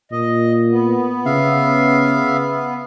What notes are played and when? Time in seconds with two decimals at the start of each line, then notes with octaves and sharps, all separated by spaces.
0.12 A#2 D#5
0.70 B3
1.26 C#3 E5 F5